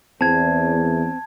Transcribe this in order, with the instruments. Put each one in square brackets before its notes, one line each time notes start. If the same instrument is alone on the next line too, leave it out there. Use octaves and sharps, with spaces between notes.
[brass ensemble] E2 [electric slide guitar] C4 [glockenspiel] A5 G#6